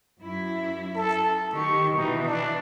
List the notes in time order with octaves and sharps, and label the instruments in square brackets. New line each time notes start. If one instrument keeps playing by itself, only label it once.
[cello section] F#2 E4
[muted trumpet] A4
[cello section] D#3 G4 [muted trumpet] C#6
[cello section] B2 E3 [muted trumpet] D#4
[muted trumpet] D4